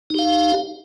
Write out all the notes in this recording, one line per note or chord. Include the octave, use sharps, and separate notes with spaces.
D#4 G4 F5